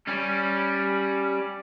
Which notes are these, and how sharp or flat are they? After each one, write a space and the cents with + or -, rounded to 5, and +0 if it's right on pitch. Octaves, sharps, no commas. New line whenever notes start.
G3 +0 C#4 +0